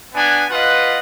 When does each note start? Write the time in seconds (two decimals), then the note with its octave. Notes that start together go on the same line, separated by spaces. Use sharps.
0.15 B3 D4 G#5
0.51 F4 B4 D#5 F#5